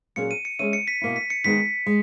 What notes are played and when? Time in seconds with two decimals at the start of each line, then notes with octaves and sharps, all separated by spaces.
0.16 A#2 F#3 A#3 C#4 G#4 C#7
0.31 D#7
0.45 C#7
0.59 G#3 C#4 G#4 C#5 E5 D#7
0.73 C#7
0.88 B6
1.02 B2 A#3 E4
1.16 B6
1.30 C#7
1.44 D#3 G#3 B3 D#4 G#4 B6
1.86 G#3